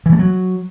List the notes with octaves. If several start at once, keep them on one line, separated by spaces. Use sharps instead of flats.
E3
A3
F#3